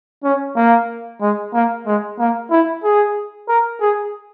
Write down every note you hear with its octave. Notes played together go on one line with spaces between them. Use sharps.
C#4
A#3
G#3
A#3
G#3
A#3
E4
G#4
A#4
G#4